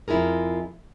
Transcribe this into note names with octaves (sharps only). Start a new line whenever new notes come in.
F2 E4 F4 G#4 A#4